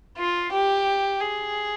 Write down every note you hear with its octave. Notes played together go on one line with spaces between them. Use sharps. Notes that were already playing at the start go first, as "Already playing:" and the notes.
F4
G4
G#4